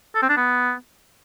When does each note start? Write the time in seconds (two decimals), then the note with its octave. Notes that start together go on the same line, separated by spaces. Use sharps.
0.15 A4
0.22 C4
0.29 D4
0.37 B3